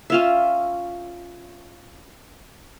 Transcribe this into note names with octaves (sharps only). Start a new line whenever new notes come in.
C#4 F4 E5